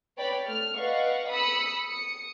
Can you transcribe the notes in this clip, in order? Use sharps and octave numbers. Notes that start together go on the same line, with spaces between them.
B4 C#5 D5 G5 B5
A3 F6
B4 D5 D#5 F5 F#5 C#6
B5 D#6 E6 C#7
D#6 C#7